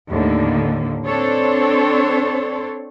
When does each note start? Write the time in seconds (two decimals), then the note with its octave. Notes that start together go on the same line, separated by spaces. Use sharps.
0.10 D#2 A2 D3 A#3
1.06 C4 D4 A4 C5 C#5